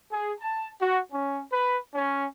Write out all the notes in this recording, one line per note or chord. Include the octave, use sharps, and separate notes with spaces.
G#4
A5
F#4
C#4
B4
C#4